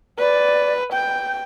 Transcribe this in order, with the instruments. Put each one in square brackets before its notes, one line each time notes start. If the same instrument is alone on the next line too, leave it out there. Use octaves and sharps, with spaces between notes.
[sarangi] B4 [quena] D5
[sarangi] G5 [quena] G6